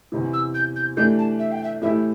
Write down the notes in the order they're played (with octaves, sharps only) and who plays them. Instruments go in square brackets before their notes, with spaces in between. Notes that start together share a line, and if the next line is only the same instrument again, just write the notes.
[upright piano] E2 C3 E3
[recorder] E6
G6
G6
[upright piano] E3 A3 D4 G4 [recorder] G6
[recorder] A5
E5
G5
E5
[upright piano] A2 E3 A3 E4 G4 [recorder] E5